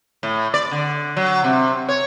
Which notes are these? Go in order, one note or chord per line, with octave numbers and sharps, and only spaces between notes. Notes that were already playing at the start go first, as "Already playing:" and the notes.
A2
D5
D3
F#3
C3
C#5